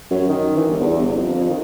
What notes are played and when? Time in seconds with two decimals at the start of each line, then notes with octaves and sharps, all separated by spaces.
0.11 F#2
0.29 D#3
0.56 E3
0.69 G1
0.81 E2
0.98 G1
1.15 F2
1.34 F2
1.50 D#3